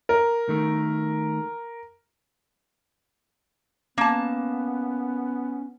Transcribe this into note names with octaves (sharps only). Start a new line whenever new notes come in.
A#4
D#3 A3
A#3 B3 C#4 A5